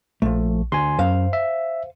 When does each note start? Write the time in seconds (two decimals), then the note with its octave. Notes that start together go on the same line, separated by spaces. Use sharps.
0.22 A#1 F3 A3
0.72 D2 G#5 C6
0.99 F#2 C5 F5
1.33 E5